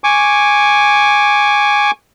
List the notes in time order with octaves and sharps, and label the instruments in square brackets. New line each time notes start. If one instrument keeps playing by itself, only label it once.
[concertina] G#5 C#6 D6